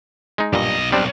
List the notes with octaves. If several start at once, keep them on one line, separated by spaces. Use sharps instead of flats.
G#3 D#4
B1 G2 A#2 D#5
B1 G3 C4 D4